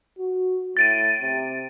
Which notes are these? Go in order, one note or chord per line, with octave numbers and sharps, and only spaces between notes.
F#4
A2 A6 D7 D#7
C3